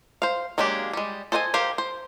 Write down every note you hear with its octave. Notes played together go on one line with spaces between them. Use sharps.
C5 F5
F#3 G#3 A#3 D4 G4
G3 G#3
A4 C5 D#5 G5 G#5
G4 A#4 C5 F5
C5